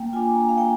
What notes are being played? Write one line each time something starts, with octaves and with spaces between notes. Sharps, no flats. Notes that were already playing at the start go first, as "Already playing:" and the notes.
Already playing: A#3 G5
D4 F4 G#5
A#5
F5
A#3 G5